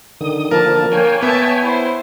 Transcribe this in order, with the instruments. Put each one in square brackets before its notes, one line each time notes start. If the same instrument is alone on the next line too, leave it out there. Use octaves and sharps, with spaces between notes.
[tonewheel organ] D3 D#3 D#6
[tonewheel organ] D3 F3 A#3 [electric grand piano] A#4 [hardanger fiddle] A5
[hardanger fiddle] A#3 [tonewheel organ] C#5 G5 G#5
[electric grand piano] B3 [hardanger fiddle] E5 A5
[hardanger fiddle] E4 C5